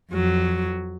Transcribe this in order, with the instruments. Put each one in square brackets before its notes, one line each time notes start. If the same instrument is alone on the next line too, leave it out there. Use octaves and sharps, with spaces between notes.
[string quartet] F2 F#3